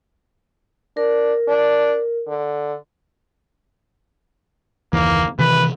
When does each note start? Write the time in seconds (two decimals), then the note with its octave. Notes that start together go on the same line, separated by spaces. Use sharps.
0.97 D4 A#4
1.48 D4
2.28 D3
4.93 F#1 D#2 E3 A#3
5.39 C3 D#3 E3 B4